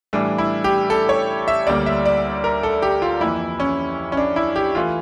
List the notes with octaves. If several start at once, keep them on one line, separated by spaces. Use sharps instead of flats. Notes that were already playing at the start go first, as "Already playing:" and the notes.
A2 E3 G3 D4
E4
G4
A4
C#5
E5
D2 D3 G3 A#3 D5
E5
D5
A#4
A4
G4
F4
F2 E3 A#3 E4
C#4
C#4
D4
E4
G4
E3 A3 F4